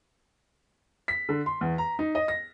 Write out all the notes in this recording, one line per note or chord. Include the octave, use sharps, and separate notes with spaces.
B6
D3
C6
E2
A#5
D#4
D#5
A#6